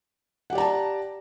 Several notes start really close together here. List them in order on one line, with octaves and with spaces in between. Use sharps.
F#5 G4 D5 A#5 A5